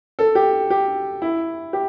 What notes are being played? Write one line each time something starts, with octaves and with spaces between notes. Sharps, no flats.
A4
G4
G4
E4
G4